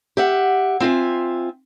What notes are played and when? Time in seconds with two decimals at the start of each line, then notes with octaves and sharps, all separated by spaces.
0.17 G4 E5 F#5
0.80 C4 F4 E5 G#5